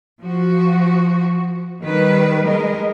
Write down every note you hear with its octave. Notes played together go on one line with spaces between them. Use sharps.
F3 F#4
D#3 G3 B4
G#3 A#4 D#5